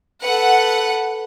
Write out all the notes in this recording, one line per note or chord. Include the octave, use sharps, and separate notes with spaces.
A4 B4 F#5